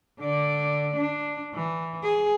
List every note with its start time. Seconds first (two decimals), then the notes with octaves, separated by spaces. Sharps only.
0.19 D3 D5
0.96 D4
1.54 E3
2.04 G#4